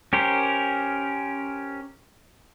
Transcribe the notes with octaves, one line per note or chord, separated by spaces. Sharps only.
C#4 G4 A#4 C5